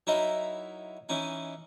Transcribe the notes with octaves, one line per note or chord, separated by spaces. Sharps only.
F#3 D#4 E4 A#4 D#5
E3 C#4 D#4